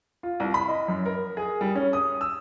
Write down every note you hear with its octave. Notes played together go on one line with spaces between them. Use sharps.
F4
C2
B5
D#5
F#2
A#4
G#4
G3
C#4
D#6
E6